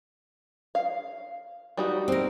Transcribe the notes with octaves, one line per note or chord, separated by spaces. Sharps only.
F5
G3 D#4 F#4
C4 A#4